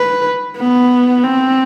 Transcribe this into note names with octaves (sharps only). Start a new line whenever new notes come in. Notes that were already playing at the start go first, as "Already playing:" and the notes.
Already playing: B4
B3
C4